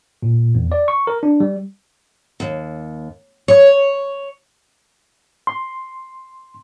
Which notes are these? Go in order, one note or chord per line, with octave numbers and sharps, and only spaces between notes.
A#2
E2
D5
C#6
A#4
D4
G3
D#2
C#5
C6